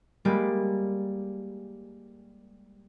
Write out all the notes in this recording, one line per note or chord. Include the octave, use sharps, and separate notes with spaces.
G3 G#3 A#3 G4